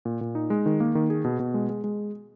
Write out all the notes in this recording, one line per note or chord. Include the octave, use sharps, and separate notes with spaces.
A#2
A#2
D#4
G#3
D#3
A#3
D#3
G#4
B2
B2
G#3
G#3
G#3